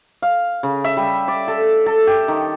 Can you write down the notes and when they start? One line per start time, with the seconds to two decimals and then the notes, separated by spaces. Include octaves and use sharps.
0.22 F5
0.63 C#3
0.84 E5
0.97 G3
1.28 D5
1.48 A4
1.86 A4
2.07 G4
2.28 D#3